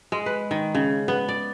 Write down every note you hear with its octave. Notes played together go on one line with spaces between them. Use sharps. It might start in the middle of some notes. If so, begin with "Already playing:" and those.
G#3
B4
D#3
C#3
B3
D5